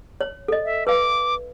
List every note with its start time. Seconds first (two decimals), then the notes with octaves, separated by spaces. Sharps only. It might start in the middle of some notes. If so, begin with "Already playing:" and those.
0.21 C#5
0.48 A4 D#5
0.65 E5
0.87 B4 F5 D6